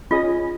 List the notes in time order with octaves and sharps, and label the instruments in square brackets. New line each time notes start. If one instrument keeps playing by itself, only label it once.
[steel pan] C#4 G#4 D#5 [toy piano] F4